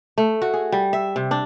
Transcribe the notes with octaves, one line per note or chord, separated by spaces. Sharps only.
A3
F#4
G#4
G3
E5
C3
D4